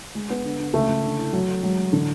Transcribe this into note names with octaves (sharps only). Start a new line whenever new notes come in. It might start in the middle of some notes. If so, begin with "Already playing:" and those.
G#3
B3
D3
D3
C#2 A3
C#2
D3
E4
F#3 A3
A3
F#3 G#3
G#3
A2 D3